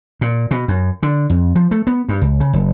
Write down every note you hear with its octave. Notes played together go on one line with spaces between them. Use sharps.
A#2
B2
F#2
D3
F2
F3
A3
B3
G2
C#2
C#3
F#1